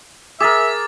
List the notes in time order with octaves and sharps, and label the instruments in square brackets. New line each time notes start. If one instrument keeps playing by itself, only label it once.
[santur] G#4 A#4 [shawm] E5 [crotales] D6 A6